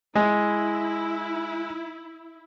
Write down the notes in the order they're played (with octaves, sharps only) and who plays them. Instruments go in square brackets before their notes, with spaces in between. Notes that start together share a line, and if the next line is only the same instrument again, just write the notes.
[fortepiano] G#3 [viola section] E4